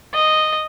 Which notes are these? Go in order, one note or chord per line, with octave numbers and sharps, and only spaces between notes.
D#5